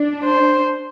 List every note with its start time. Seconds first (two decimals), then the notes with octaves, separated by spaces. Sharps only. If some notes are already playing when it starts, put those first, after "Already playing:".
Already playing: D4
0.24 C5